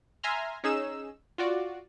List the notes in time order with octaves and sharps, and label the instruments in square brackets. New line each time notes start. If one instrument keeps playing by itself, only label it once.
[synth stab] E5 G#5 A#5 C6 F6
C#4 D#4 G#4 E6 E7
F4 F#4 D5